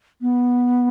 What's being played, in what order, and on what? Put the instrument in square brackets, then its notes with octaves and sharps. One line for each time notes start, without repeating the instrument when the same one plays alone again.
[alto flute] B3